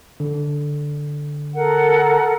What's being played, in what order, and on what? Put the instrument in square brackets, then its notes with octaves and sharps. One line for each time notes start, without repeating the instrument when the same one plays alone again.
[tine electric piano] D3
[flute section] A4 A#4 F#5